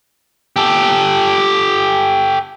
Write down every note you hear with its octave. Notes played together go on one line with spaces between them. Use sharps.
G4 A4